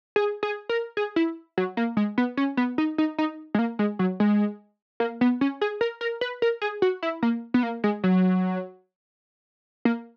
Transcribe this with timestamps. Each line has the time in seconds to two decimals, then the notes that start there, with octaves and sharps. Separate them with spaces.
0.16 G#4
0.43 G#4
0.69 A#4
0.97 G#4
1.16 E4
1.58 F#3
1.77 A#3
1.97 G#3
2.18 B3
2.37 C#4
2.57 B3
2.78 D#4
2.98 D#4
3.18 D#4
3.55 G#3
3.59 A#3
3.79 G#3
3.99 F#3
4.20 G#3
5.00 A#3
5.21 B3
5.41 C#4
5.61 G#4
5.81 A#4
6.01 A#4
6.21 B4
6.42 A#4
6.62 G#4
6.82 F#4
7.03 E4
7.23 A#3
7.54 B3
7.63 A#3
7.84 G#3
8.04 F#3
9.85 A#3